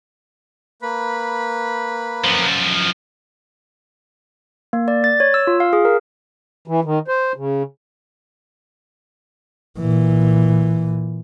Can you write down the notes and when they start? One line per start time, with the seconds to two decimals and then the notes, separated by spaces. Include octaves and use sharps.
0.82 A#3 B4 B5
2.24 F#2 F3
4.73 A#3
4.88 D5
5.04 A6
5.20 C#5
5.34 E6
5.47 F4
5.60 F5
5.73 G#4
5.85 A#4
6.68 E3
6.84 D#3
7.08 C5
7.36 C#3
9.79 A#2 E3